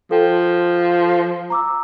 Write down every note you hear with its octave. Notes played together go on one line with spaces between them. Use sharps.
F3 A4 G5
A#5 D6 E6